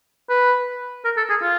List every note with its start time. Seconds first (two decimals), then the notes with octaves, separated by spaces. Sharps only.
0.30 B4
1.05 A#4
1.17 A4
1.30 G#4
1.42 F4